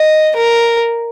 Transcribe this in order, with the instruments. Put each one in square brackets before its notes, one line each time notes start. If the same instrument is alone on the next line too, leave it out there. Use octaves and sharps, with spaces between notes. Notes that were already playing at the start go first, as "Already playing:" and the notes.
Already playing: [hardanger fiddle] D#5
A#4